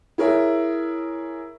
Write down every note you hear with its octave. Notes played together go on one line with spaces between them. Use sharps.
E4 G#4 A#4 C#5 E5